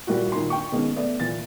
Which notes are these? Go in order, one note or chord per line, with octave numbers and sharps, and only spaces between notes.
A#2 G3 A#3 E4 F#4
A#2 D#3 D#4 C6
D4 G5 C#6
B2 D#3 G#3 A#3 C#4
A3 B3 D5
A#2 E3 A6